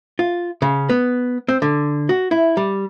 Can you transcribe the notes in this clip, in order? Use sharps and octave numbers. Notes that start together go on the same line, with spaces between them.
F4
C#3
B3
C4
D3
F#4
E4
G3